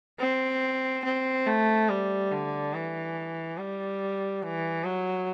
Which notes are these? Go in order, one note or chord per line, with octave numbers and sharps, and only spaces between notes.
C4
C4
A3
G3
D3
E3
G3
E3
F#3